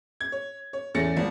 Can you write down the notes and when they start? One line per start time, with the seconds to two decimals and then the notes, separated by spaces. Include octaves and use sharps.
0.21 G#6
0.32 C#5
0.73 C#5
0.94 E2 A3 C#4 A6 A#6 C#7
1.17 G#1 F3